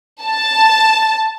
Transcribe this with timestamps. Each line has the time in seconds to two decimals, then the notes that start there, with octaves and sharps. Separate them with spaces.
0.24 A5